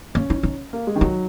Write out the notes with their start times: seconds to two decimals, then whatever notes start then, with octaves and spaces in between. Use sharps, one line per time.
0.15 A#3 C#4
0.30 D#4
0.43 D#4
0.73 A#3
0.87 G#3
0.96 D#3
1.01 F#3 D#4